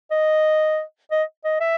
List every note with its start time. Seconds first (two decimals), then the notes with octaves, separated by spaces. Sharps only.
0.11 D#5
1.11 D#5
1.44 D#5
1.61 E5